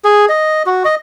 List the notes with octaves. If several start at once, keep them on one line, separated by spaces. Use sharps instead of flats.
G#4
D#5
F#4
D#5